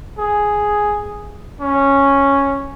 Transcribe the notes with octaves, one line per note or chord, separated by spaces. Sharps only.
G#4
C#4